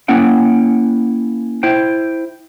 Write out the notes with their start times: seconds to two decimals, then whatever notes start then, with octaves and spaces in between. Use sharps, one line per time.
0.08 A#3 C#4 E4 F#5 G5
1.63 E4 C5 G5